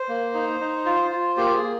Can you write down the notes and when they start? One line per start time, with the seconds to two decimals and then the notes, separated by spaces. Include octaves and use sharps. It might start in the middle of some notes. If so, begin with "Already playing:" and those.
Already playing: C5
0.09 A#3
0.34 D#4
0.60 D#4
0.86 F4
1.11 F4
1.37 A#3 G4
1.54 G#4
1.63 A#3